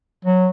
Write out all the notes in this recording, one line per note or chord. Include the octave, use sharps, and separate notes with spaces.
F#3